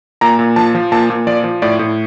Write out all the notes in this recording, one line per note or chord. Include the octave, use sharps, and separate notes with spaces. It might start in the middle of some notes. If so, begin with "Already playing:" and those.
A#2 A#5
A#2
F3 A5
F3
A#2 A5
A#2
F3 D5
F3
A2 D5
A2